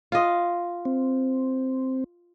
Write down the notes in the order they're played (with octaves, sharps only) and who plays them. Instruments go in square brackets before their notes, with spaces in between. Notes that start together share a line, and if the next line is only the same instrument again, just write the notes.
[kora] F4 D#5
[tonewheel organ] C4